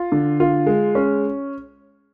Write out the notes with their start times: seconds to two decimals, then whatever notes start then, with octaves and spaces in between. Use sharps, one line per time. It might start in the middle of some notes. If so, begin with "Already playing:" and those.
Already playing: F4
0.12 D3
0.40 F4
0.66 G#3
0.95 C#4